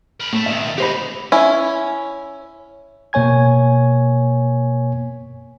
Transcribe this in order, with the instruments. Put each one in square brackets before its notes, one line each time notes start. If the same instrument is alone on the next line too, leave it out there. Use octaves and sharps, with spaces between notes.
[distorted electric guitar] A#4 B5
[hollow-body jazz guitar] A2 [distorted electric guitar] A3
[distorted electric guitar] G#2 D#3 [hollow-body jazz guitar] B2 E5
[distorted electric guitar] D#4 F#4 [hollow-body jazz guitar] G4 C5 B5
[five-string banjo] C#4 E4
[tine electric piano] B2 A#3 C#5 G#5 G#6